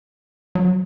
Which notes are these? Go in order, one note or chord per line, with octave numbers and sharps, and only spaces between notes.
F#3